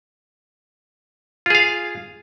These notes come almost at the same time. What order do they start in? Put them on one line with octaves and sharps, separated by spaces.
F4 G#4 F5